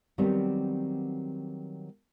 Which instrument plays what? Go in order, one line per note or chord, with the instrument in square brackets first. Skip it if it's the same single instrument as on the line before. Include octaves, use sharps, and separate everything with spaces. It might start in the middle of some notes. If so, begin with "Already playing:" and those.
[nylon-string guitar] D#3 F#3 G3 B3 C4